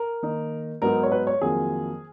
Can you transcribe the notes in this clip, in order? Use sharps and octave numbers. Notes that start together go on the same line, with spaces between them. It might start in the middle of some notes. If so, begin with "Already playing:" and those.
Already playing: A#4
D#3 A#3 D#4
G#2 F#3 B3 D#4 A#4
C#5
B4
C#5
F2 D#3 F#3 A#3 F4 G#4